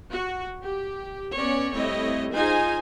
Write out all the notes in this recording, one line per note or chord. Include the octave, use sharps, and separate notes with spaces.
F#4
G4
B3 C#4 C#5 D5
G3 A3 C4 E4 C#5 D#5
D#4 F4 G#4 C5 G#5